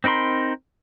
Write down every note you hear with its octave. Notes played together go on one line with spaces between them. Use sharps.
C4 D#4 A#4 B5 C6